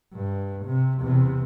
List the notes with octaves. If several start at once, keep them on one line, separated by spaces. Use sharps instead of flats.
G2
C3
E2 C3